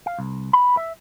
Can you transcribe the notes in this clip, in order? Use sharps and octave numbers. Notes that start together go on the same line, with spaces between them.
F5
C2
B5
E5